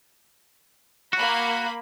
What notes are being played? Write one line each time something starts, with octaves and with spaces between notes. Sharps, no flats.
A#3 F#4 B5